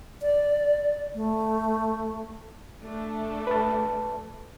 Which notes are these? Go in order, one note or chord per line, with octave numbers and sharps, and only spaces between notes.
D5
A3
A3 D4 A4
B4 A5